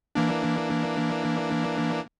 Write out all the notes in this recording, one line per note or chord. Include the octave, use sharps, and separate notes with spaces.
E3 A#3 D4